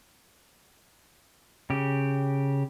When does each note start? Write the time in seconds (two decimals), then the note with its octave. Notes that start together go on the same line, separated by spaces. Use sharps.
1.70 C#3 G4